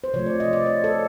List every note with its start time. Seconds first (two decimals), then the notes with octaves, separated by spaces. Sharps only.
0.04 C5
0.14 C3 F3 A3 C#5
0.26 D5
0.40 D#5
0.53 D5
0.66 C#5
0.84 A4